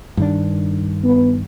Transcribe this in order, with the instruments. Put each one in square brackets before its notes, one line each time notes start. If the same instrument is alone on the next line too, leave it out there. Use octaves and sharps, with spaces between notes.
[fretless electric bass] G2 D#3 D4
[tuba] B3